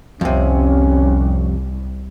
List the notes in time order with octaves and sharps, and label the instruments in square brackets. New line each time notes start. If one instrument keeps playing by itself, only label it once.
[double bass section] C2 [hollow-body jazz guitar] F2 C3 [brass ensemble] C#4